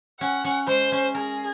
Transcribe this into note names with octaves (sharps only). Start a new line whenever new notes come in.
C#4 F#5
C#4
G#3 C5
C#4
G#4 A#4